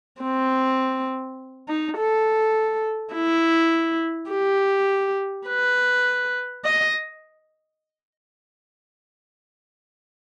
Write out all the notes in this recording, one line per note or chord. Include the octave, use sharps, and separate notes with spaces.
C4
D#4
A4
E4
G4
B4
D#5